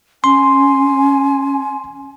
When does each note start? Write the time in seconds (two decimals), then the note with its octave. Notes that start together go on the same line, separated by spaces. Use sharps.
0.24 C#4 G#5 C6